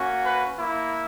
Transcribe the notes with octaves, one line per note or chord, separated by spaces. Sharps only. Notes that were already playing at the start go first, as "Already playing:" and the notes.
Already playing: A#3 C#4 F#4
B4
A#3 E4